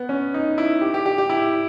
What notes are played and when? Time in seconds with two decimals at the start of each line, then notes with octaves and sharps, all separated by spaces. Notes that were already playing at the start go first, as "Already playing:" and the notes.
Already playing: B3
0.09 C#4
0.34 D#4
0.58 E4
0.81 G4
0.94 G4
1.06 G4
1.18 G4
1.30 E4